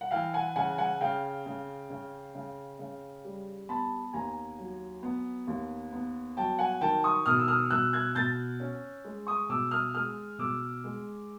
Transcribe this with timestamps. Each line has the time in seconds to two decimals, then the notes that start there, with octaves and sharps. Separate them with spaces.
0.01 F#5
0.11 E3 F5 G5
0.34 F#5 G#5
0.56 C#3 F#5 G#5
0.78 F#5 G#5
1.01 C#3 F5 G5
1.46 C#3
1.90 C#3
2.35 C#3
2.79 C#3
3.24 G3
3.69 B3 A5 B5
4.13 D#2 G#5 A#5
4.58 F#3
5.03 B3
5.47 D#2
5.92 B3
6.37 F#3 G5 A5
6.59 F#5 G#5
6.81 D#3 G5 A5
7.04 C#6 D#6
7.26 B2 D#6 F6
7.39 E6
7.48 D#6 F6
7.71 B2 E6 F#6
7.93 F#6 G#6
8.15 B2 G6 A6
8.60 C#4
9.05 G#3
9.27 C#6 D#6
9.49 B2 D6 E6
9.71 D#6 F6
9.94 G#3 D#6 F6
10.38 B2 D6 E6
10.84 G#3